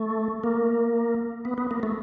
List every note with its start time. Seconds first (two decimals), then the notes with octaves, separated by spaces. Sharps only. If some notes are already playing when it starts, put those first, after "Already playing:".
Already playing: A3
0.44 A#3
1.45 B3
1.58 B3
1.71 A#3
1.83 A3